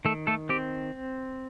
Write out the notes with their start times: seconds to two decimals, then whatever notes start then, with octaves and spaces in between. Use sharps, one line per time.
0.05 D#3 A3 A4
0.27 A3 A4
0.49 C4 G4